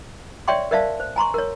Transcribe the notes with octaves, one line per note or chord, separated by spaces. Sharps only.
C#5 D5 E5 G5 C6 C#6
A#4 C5 D5 E5 F5 A5
C5
G#5 A#5 C6 C#6
A#4 C#5